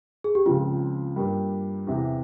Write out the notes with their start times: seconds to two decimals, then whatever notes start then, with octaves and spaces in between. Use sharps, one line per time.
0.24 G#4
0.35 G4
0.45 C#2 C#3 F3 C4 F4
1.16 G2 G3 A#3
1.87 E2 C3 E3